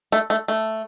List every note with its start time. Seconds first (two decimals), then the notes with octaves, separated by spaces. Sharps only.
0.12 A3
0.30 A3
0.48 A3